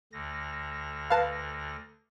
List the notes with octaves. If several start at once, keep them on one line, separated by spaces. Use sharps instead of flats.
D2 D3 A#6
B4 F5 A5 B5